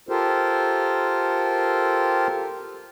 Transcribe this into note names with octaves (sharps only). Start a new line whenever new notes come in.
F4 G4 A4 A#4 C5